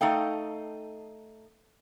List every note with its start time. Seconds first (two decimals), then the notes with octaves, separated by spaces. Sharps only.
0.01 A3 D#4 A4 D#5 F5 G5